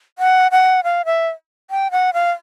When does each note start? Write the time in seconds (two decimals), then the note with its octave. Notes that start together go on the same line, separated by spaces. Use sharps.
0.19 F#5
0.52 F#5
0.84 F5
1.05 E5
1.71 G5
1.91 F#5
2.14 F5